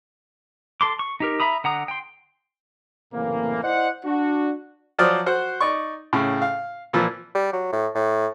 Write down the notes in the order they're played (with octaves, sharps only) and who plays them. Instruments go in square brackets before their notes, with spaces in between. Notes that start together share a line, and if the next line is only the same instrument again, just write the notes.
[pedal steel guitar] A4 C6 D6
C#6
D#4 G4 A#4
E5 A#5 B5 D#6
D3 F#5 A#5 D#6
G5 C6
[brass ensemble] F#1 A2 C3 E3 A#3
E4 C5 D5 D#5 F#5
D4 F#4
[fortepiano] F3 F#3 C5 D5 D#6 F6
F#4 C5 F#5
D#4 D5 C#6
A2 C#3
F5
A#2 E3 F3
[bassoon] G3
F#3
A2
A2